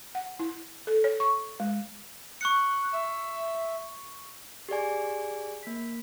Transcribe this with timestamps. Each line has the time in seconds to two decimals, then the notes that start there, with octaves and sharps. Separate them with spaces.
0.15 F#5
0.40 E4
0.87 A4
1.04 C#5
1.20 C#6
1.60 G#3
2.41 C#6 F#6 C#7
2.92 E5
4.69 G4 G#4 D5 G#5
5.63 A#3 B6